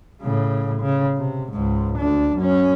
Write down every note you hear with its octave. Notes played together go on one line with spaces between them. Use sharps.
A2 C#3
C#3
C3
C#2 G#2
D2 D4
F#2 C#4